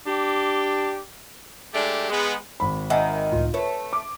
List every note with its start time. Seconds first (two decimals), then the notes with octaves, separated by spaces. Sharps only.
0.06 D4 G4
1.74 G#3 A3 D4 G4
2.10 G#3 B3
2.60 G#1 B5
2.90 D#3 E5 F#5 G#5
3.32 C#2 A2 F4
3.54 A3 B4 C#5
3.93 D6